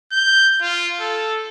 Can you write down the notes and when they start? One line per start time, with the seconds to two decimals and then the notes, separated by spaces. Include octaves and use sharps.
0.12 G6
0.61 F4
1.00 A4